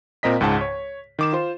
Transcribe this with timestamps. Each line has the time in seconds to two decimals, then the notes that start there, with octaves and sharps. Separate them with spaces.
0.23 A#2 C4 A#4 D#5 B6
0.41 C#2 G#2 C#3 F#5 A5
0.61 C#5
1.19 D#3 D6 E7
1.33 F4 C5